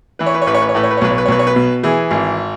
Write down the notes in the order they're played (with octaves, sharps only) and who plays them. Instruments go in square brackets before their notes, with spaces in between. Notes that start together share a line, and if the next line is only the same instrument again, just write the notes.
[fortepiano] E3 B4
C#5
B4
C#5
A1 B4
C#5
B4
C#5
A2 B4
C#5
B4
C#5
B1 B4
C#5
B4
C#5
B1 B4
C#5
B4
B2
E3 G#4
G#1